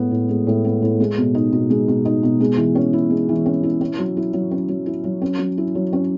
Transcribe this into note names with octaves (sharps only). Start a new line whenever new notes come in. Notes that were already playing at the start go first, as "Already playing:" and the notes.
Already playing: A2 G#3 B3
A2
G#3
A2
B3
A2
G#3
B2
D#4
B2
G#3
B2
D#4
B2
G#3
E3
C#4
E4
G#3
E3
C#4
E4
C#4
F#3
E4
F#3
C#4
F#3
E4
F#3
C#4
F#3
E4
F#3
C#4